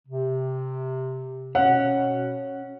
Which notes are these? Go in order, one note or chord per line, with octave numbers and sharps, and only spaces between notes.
C3
B2 C#4 C#5 F#5